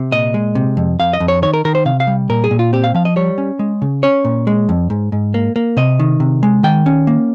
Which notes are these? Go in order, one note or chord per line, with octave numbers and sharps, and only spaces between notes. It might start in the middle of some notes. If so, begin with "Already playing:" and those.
Already playing: C3
A#2 D#5
G#3
C3
F2
F2 F5
D#5
F2
C#5
D#3 C#5
A#4
D#3 A#4
C5
C3 F5
F5
G3
A#2 A#4
G#4
A#2
F4
C4 G4
F5
F3 F5
D#5
G3 C#5
C#4
G#3
C#3
C#4 C#5
A#2
G#3
F2
G#2
G#2
A#3
A#3
C3 D#5
D#3
C3
G#3
D#3 G5
C#4
A#3